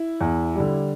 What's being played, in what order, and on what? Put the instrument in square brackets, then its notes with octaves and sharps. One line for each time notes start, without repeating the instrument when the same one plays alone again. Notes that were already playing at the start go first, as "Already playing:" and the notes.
Already playing: [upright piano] E4
E2
D3 G3